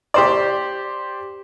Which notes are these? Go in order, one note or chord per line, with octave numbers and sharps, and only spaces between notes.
G4 C5 D5